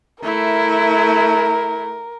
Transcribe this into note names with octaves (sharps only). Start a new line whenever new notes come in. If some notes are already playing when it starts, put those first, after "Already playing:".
A3 E4 A#4